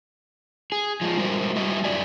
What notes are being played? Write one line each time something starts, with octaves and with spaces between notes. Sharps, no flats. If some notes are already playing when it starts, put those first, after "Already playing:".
G#4
F3 G#3
G3 G#3 F#4 A#4 C5 E5
G3 F#4 D#5 E5
F#2 A#2 G4 D5 G#5